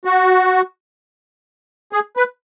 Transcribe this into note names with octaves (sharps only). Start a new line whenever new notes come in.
F#4
G#4
B4